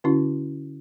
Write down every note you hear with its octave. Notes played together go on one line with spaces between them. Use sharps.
D3 C#4 E4 F#4